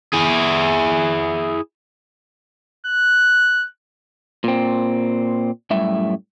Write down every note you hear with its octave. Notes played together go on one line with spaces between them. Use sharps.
E4 G#4
F#6
A#2 C4
F#2 A2 G3 E5